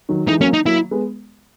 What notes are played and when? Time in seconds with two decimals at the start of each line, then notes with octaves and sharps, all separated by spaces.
0.09 D#3 F#3
0.28 E3 G#3 D#4
0.41 F#3 A#3 C#4
0.53 D#4
0.66 F#3 A#3 E4
0.91 G#3 B3